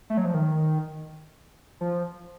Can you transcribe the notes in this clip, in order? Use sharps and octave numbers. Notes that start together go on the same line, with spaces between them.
A3
F#3
F3
D#3
F3